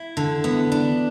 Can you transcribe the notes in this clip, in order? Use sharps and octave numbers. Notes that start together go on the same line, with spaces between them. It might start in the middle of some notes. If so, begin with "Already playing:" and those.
Already playing: E4
D3
B3
D4